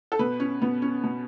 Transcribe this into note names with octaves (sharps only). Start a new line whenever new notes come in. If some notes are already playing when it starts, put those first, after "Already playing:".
A4
B2 B4
C#4
B2 B3
C#4
B2